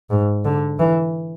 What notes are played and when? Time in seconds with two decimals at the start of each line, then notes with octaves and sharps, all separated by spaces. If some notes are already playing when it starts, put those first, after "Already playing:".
0.10 G#2
0.45 D3
0.79 E3